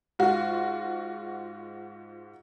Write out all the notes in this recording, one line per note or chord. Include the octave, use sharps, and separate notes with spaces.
G#2 F4 F#4